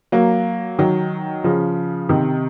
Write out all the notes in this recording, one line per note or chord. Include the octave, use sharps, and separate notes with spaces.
F#3 A#3
D#3 F#3
C#3 F3
C3 D#3